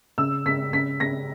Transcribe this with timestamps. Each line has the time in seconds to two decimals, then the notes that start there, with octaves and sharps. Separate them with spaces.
0.18 C#3 E6
0.46 C#3 B6
0.73 C#3 B6
1.00 C#3 A#6